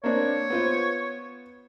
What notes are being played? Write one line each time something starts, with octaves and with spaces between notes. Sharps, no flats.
A#3 C4 D4 C#5
B3 F4 C5